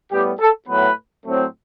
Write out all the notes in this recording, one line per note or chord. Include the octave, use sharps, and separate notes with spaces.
A2 G3 B3 G4
A4
A2 F#3 B3 B4
A2 F#3 A3 C4